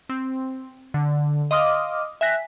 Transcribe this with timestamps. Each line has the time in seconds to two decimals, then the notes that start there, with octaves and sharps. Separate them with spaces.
0.09 C4
0.94 D3
1.51 D#5 F5 C6 D6 D#6 F6
2.21 E5 G5 G#5 F#6 A#6 B6